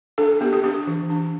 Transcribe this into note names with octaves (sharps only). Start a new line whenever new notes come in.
D4 A4
B3 G4
G4
D4 G4
E3
D4